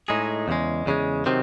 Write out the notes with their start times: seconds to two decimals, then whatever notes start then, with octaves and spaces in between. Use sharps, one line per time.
0.08 A2 G#3 D#4 G#4
0.48 E2 C#3 G#3
0.86 E2 C#3 G#3
1.26 C3 D#3 F#3 C4